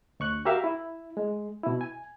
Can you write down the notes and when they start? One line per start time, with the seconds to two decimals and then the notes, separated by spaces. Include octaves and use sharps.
0.20 D2 C#6 F#6
0.45 F#4 G4 A#4 E5 F5
0.64 E4
1.17 G#3
1.64 B2 E4
1.81 G#5